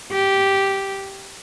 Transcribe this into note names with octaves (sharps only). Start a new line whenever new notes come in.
G4